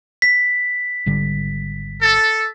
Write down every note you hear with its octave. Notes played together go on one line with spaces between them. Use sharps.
B6
G#1 D3 G3
A4